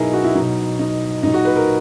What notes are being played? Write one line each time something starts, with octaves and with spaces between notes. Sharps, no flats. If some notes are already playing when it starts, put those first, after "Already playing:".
Already playing: B2 F#3 D#4 E4 G#4 A#4
F#4
E4
B2 F#3 D#4
D#4
A#2 F#3 D#4
F#4
B4
A#4